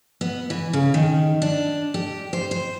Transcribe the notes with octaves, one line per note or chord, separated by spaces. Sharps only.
B3
E3
C#3
D#3
D4
G4
C5
C5